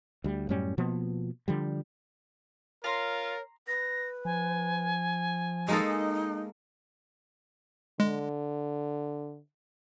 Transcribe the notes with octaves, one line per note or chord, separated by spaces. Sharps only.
D2 G3
F#2 A2 G3 C#4
B2 F3 A#3 B3
D3 F3 G3
F4 A#4 C#5 A#5 C6
B4 A#6
F3 G#5
G#3 A#3 D#4 A4
D3 G#3